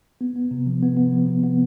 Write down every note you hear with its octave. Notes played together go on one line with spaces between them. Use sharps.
B3
B3
C3
F3
B3
B3
F3
C3
B3